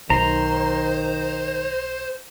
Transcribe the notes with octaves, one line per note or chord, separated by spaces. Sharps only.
B1 D#3 C5 A#5